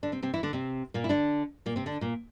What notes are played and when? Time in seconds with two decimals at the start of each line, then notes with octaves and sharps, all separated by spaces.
0.03 D3 D4
0.12 C3 C4
0.22 C3 C4
0.34 E3 E4
0.43 D3 D4
0.53 C3 C4
0.94 A#2 A#3
1.04 E4
1.09 D3 D4
1.66 A#2 A#3
1.76 C3 C4
1.86 D3 D4
2.01 A#2 A#3